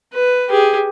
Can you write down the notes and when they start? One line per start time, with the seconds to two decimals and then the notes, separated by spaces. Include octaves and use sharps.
0.14 B4
0.49 G4 G#4